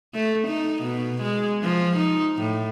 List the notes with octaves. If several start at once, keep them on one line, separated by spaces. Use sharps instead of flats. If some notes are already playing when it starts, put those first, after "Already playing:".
A3
D#4
B2
G#3
F3
D#4
A2